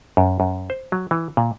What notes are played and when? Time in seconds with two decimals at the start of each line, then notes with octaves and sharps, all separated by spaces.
0.17 F#2
0.40 F#2
0.70 C5
0.92 F#3
1.11 E3
1.37 A#2